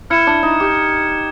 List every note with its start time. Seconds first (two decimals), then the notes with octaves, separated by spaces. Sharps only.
0.10 E4 F6 G#6 C#7 E7
0.27 D4
0.43 D#4
0.60 G4